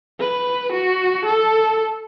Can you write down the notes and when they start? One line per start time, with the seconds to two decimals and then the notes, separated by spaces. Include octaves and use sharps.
0.20 B4
0.72 F#4
1.25 A4